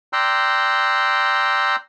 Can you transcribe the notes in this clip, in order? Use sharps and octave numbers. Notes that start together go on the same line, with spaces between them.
D5 G5 A#5 C6 E6 F#6